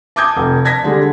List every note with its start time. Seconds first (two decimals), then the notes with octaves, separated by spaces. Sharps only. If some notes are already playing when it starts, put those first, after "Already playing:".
0.16 A5 D6 D#6 G6 G#6
0.36 F1
0.65 A5 G#6 A#6 B6
0.84 D3 G3 G#3